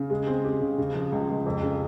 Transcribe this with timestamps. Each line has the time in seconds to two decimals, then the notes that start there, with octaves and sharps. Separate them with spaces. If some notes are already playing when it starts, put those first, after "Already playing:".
Already playing: C#3
0.10 G#3
0.27 C4
0.44 G4
0.61 C#3
0.78 C#3
0.95 F3
1.12 C#2
1.29 C#2
1.46 F2
1.63 C#3